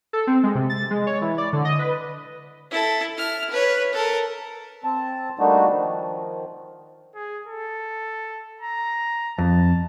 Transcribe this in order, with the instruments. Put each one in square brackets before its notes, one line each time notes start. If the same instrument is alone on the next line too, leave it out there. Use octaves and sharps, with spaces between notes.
[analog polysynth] A4
C4
G#3
C3
A6
G#3
C#5
E3
D5
D3
D#5
B4
[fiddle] E4 A4
E4 F6
B4 C#5
A4 A#4
[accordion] C4 A5
G3 A3 A#3 D4 D#4 F#4
D#3 F3
[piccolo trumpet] G#4
A4
A#5
[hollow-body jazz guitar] F2 [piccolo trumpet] A5